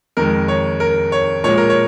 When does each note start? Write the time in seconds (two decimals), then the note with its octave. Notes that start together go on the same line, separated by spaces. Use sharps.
0.17 F2 D#3 G#3 A#4
0.48 C#5
0.80 A#4
1.12 C#5
1.44 A#2 F3 G#3 C#5
1.57 A#4
1.70 C#5